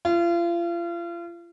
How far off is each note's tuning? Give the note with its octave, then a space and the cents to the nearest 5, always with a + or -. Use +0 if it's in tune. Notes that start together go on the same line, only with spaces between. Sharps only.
F4 -35